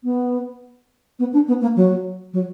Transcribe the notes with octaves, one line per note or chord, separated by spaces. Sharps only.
B3
B3
D4
B3
A#3
F#3
F#3